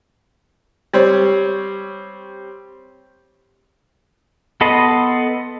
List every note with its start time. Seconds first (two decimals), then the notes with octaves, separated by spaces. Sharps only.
0.93 G3 C4 C#5
4.61 B3 A4 D#5 B5 C6